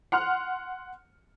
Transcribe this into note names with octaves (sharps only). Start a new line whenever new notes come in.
F#5 C6 F6